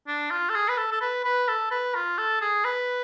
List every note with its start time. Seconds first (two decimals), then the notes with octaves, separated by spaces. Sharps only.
0.08 D4
0.30 F4
0.49 A4
0.55 G#4
0.68 B4
0.78 A4
0.92 A4
1.01 B4
1.25 B4
1.48 A4
1.71 B4
1.95 F4
2.18 A4
2.41 G#4
2.64 B4